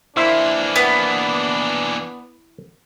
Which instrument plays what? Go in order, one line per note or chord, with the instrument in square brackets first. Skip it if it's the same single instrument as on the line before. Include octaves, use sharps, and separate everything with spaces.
[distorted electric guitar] E3 A#3 [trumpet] D4 [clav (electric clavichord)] E4 C5 E5
[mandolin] B3